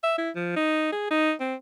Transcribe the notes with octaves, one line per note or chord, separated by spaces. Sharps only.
E5
E4
F3
D#4
G#4
D#4
C4